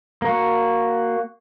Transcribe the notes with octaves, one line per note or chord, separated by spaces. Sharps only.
A#3 F#4